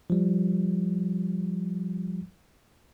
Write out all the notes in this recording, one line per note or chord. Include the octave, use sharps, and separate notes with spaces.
F3 G3